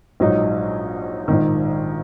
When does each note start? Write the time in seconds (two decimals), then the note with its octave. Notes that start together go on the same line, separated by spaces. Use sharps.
0.20 A#1 G#2 F#3 D#4
1.28 A#1 G#2 D#3